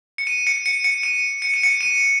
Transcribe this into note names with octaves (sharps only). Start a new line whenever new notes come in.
C#7
D#7
C#7
C#7
C#7
D#7
C#7
D#7
C#7
D#7